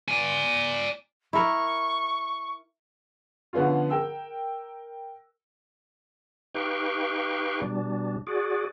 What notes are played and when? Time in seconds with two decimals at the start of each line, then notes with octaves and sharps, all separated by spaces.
0.08 D5 G#5
1.33 E4 A#4 C#6
3.53 D3 F3 B3 C#4 F4
3.90 A#4 G5 E6
6.54 D#4 G4 B4 F5 G5 C#6
7.61 B2 G3 D4
8.27 F#4 G#4 D5